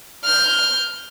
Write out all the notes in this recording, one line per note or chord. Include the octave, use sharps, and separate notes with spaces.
F6 G6